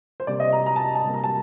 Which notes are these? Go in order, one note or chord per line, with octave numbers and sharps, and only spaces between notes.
C5
C3 G3 A#3 D5
D#5
A#5
A#5
A5
A5
C3 G3 A#3
A#5
A5